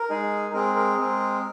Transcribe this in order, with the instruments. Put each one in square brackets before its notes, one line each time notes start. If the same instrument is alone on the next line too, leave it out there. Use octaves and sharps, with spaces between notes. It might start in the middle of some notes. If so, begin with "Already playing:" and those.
Already playing: [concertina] A#4
G#3 D#4 G#4
G#3 C4 G#4 A#4
A#4
G#3 C4 G#4